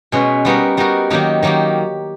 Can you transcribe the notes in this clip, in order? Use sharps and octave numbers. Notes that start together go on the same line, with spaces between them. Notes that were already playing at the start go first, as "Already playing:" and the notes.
B2 G#3 C#4 F#4 B4
G3 B3 D#4 F#4 A#4
G3 B3 D#4 F#4 A#4
D#3 F#3 A#3 D#4 G4
D#3 F#3 A#3 D#4 G4